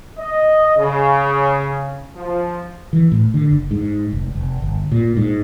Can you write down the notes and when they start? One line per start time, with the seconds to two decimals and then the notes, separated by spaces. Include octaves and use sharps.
0.19 D#5
0.78 C#3
2.16 F3
2.93 E3
3.12 A2
3.34 D3
3.50 F#1
3.71 G#2
4.12 F1
4.35 F1
4.62 G1
4.92 A#2
5.17 G#2